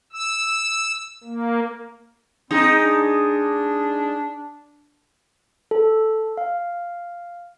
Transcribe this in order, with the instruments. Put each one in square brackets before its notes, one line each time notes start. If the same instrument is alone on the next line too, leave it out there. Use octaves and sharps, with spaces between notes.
[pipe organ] E6
A#3
[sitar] G#3 D#4 [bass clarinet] C4
[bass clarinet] D4
[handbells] A4
F5